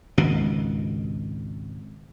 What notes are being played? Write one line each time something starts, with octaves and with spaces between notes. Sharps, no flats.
G#1 C#2 B2